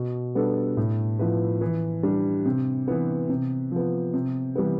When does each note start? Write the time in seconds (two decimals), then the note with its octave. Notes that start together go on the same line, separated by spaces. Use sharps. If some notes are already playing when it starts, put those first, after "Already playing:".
Already playing: B2
0.35 G3 B3 D4 A4
0.77 A2
1.19 F3 B3 E4 B4
1.61 E3
2.03 G3 D4
2.46 C3
2.88 E3 B3
3.30 C3
3.72 F3 B3
4.14 C3
4.55 E3 G3 B3